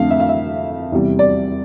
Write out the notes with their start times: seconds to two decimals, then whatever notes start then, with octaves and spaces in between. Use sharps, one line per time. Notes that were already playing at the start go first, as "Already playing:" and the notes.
Already playing: F2 D3 A3 F5
0.10 E5
0.20 F5
0.29 E5
0.92 E2 C3 G3
1.19 D5